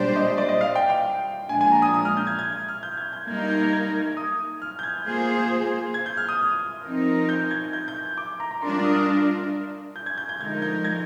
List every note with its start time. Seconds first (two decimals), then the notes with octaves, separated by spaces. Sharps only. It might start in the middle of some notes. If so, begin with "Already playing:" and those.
Already playing: A#2 G3 D4 G4 C5 D5
0.16 D#5
0.27 D#5
0.38 D5
0.49 D#5
0.61 F5
0.75 G5
0.90 G5
1.49 A#2 F3 G#3 D4 G#5
1.61 G#5
1.72 A#5
1.82 D#6
1.94 D#6
2.05 F6
2.17 G6
2.27 G#6
2.39 G#6
2.68 F6
2.83 G6
2.97 G#6
3.13 G6
3.27 G3 A#3 D#4 A#4 G#6
3.39 G6
3.50 G6
3.61 G#6
3.73 G#6
4.02 G#6
4.17 D#6
4.62 F6
4.79 G6
4.83 G#6
5.06 A#3 F4 G#4 C5
5.94 G#6
6.06 G6
6.17 F6
6.28 D#6
6.84 F3 C4 D#4 A#4
7.29 G6
7.51 G#6
7.73 G6
7.88 G6
8.18 D6
8.40 A#5
8.51 A#5
8.62 G3 D4 F4 A#4 C6
8.73 D6
8.84 D#6
8.96 F6
9.96 G6
10.06 G#6
10.18 G6
10.29 G6
10.40 D3 F3 G#3 D#4 A#4 G#6
10.62 G6
10.84 G#6